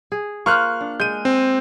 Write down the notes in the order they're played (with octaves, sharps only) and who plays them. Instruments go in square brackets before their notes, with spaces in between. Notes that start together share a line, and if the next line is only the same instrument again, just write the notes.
[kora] G#4
[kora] A#3 F4 C5 [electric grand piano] C#6 F6 F#6
[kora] D4
[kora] G#3 [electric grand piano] G6 D#7
[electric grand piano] C4